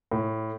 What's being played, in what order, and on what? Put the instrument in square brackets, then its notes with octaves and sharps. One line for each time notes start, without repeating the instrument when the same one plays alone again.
[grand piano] A2